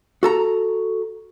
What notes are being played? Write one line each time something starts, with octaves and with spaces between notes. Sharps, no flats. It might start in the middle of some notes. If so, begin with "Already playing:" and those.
F#4 A4 A#5